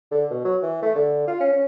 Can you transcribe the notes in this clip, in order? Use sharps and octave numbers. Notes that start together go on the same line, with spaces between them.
D3
B2
F#3
E3
A3
D3
F4
C#4
C#4